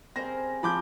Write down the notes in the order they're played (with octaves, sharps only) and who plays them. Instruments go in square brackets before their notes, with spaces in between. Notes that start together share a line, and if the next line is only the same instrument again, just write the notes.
[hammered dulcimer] C#3 G3 G#5 [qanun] C4 A#4 C5 [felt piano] A#6
[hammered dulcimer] A#2 C4 A#5 [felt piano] F3 [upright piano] B5 D6 G6